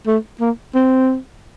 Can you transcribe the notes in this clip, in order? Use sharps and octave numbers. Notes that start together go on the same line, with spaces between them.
A3
A#3
C4